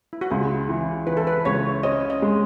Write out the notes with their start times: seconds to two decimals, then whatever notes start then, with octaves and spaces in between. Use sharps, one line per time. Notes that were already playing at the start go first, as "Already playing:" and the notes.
0.13 E4
0.21 F#4
0.30 C#2 G#4
0.69 E3
1.07 E3 B4
1.17 A4
1.27 B4
1.45 C#2 C#5
1.83 C#4 D#5
2.10 D#5
2.22 G#3